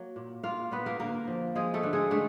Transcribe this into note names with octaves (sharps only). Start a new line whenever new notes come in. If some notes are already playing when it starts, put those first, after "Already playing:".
Already playing: F#3 A#3
A#2
A#3 F4 F5
A#2 B3 B4
A#3 A#4
D3 A#3 A#4
F3
F3 G#3 G#4
A3 A4
D3
G#3 G#4
D3 A3 A4